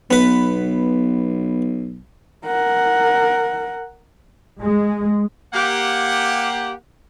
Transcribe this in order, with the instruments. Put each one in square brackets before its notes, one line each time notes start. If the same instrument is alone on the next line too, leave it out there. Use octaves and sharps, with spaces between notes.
[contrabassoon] B1 [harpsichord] B3 B4
[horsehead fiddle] A#4 F#5
[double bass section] G#3
[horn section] A#3 G4 F#5